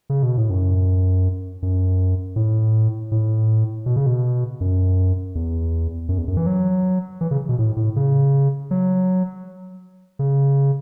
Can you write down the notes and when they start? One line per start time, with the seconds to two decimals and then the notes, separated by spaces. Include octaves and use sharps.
0.10 C#3
0.23 B2
0.37 A2
0.50 F#2
1.62 F#2
2.36 A2
3.12 A2
3.86 B2
3.96 C#3
4.06 B2
4.61 F#2
5.35 E2
6.09 F#2
6.18 E2
6.28 F#2
6.37 E3
6.46 F#3
7.21 E3
7.31 C#3
7.49 B2
7.59 A2
7.76 A2
7.96 C#3
8.71 F#3
10.19 C#3